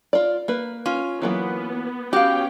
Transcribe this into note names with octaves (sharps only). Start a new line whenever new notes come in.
F4 D5
A#3 B4
C#4 F4
E3 F#3 A#3 B3
B3 C#4 F#4 G4 F5 G5